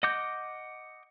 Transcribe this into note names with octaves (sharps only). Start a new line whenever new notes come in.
D#5 F#5 D6 G6